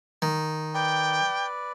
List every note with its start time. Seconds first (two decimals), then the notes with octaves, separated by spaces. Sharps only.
0.22 D#3
0.74 B4 D5 G5